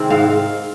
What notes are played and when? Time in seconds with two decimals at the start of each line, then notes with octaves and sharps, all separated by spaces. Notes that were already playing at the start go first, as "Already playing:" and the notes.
Already playing: C3 D#3 G#3 C4
0.10 G#2 F5